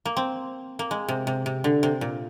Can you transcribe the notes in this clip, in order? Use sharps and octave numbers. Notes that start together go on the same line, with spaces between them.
A#3
C4
A#3
G#3
C3
C3
C3
D3
C3
A#2